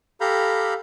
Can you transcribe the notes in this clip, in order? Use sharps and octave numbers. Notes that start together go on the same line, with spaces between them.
G4 A4 F5 A#5 B5 G6